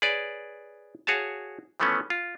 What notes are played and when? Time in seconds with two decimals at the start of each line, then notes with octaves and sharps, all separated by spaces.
0.02 G#4 B4 C#5 D5
1.07 F#4 G#4 C#5 F5 A5
1.80 E3 F3 A3 B3 C#4
2.10 F4